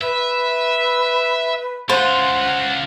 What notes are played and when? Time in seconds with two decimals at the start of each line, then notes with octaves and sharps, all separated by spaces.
0.01 B4 E5
1.89 C#3 F4 C5 F#5